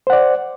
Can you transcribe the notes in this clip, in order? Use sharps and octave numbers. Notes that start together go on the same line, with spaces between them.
C5 D5 F#5